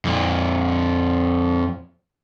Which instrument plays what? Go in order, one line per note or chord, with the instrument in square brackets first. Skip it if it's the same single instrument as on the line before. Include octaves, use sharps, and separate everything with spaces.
[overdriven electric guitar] F2 A#2